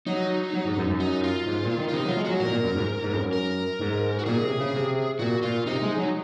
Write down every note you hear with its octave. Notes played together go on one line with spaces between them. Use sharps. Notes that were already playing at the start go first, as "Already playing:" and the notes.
F#3 D#4
F#3
G#2
F#2
F#2
D#4
F4
G#2
A#2
D#3
F4
C3 D#4
F#3
F4
G#3
F#3 F#4
A#2 A#4
A#2
F#2
G#2
G#2
F2
F#2
A#4
G#2
F#4
A#2 G#4
C3
C#3
C3
A#2 F#4
A#2 F4
C3 D#4
G#3
F#3